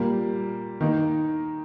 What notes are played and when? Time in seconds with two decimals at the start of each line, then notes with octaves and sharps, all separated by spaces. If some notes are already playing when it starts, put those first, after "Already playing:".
Already playing: A#2 G3 A#3
0.81 D#3 A#3 D#4